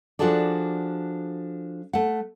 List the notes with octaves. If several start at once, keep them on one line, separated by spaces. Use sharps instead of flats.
F3 D4 F#4 G#4 A4 D5
A3 F#5